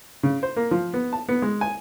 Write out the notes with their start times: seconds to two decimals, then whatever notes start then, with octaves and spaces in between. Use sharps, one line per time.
0.23 C#3
0.43 C5
0.57 A#3
0.71 F3
0.94 B3
1.13 A5
1.29 B3
1.42 G#3
1.61 G#5